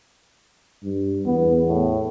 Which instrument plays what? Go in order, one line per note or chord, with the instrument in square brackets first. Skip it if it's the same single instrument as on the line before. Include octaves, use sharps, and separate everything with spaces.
[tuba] G2
[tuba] E2 [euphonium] B3
[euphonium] A2